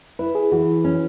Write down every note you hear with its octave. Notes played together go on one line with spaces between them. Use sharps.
E4 B4
G#4
E3 F#4
C#4